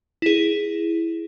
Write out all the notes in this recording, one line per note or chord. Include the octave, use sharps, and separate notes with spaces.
E4 G#4